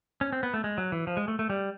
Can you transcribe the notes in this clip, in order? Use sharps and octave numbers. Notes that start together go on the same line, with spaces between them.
C#4
C4
B3
A3
G#3
F#3
E3
F3
G#3
A3
A3
G3